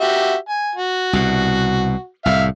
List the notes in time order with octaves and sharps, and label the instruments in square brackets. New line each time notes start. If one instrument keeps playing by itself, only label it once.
[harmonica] F#4 G4 E5
G#5
F#4
[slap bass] C2 B2
[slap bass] C2 A2 [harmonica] E5 F5